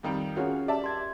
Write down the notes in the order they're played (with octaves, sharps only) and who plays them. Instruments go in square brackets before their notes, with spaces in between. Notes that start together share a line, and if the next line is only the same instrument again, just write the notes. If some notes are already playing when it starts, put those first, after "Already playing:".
[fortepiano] F2 D#3 G3
[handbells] C#4 G#4 A#4 [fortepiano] F4 F#4 C#5
[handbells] G4 [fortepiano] D5 E5 A5
[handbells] C6 G#6